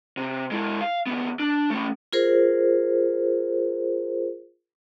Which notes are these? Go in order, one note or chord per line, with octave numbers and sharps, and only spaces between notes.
C3
G#3 E4
F5
D#2 B3
D4
A3 C#4
F4 G#4 A#4 C5